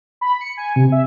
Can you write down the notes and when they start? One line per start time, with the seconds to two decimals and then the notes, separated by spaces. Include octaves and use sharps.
0.21 B5
0.41 C#7
0.57 G#5
0.76 C3
0.92 E5